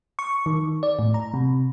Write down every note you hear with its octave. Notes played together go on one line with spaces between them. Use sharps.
C#6
D#3
D5
A2
A#5
C3